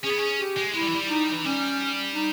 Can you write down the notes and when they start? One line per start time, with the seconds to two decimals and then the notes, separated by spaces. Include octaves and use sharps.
0.04 C#4 G#4
0.10 B3
0.18 C#4
0.39 G4
0.57 G#3
0.74 G#3 E4
0.81 G3
0.89 E3
0.95 G3
1.09 D#4
1.33 E3
1.44 G3 C#4
2.15 D#4